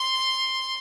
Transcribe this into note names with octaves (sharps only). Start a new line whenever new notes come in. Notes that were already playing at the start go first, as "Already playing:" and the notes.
Already playing: C6